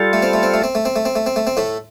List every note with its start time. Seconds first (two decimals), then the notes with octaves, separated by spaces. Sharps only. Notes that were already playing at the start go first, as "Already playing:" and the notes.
Already playing: G3 F4 A4
0.13 A3
0.22 C4
0.33 A3
0.43 C4
0.54 A3
0.64 C4
0.75 A3
0.85 C4
0.96 A3
1.05 C4
1.15 A3
1.26 C4
1.36 A3
1.47 C4
1.57 A2 A3